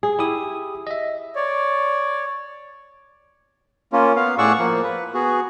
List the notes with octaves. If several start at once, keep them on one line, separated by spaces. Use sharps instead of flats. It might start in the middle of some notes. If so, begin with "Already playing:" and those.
G#4
E4 G4 D#6
D#5 E5
C#5 D5
A#3 C#4 F4
B3 F5
A2 G#4 D5 F#5 C#6 E6
F3 A#3
B4
B3 F#4 G#4